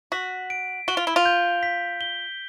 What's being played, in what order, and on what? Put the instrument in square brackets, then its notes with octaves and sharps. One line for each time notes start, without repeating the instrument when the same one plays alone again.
[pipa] F#4 [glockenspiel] B6
[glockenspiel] D7
[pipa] F#4 [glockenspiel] G7
[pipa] F4
E4
F4
[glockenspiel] G6
B6
G7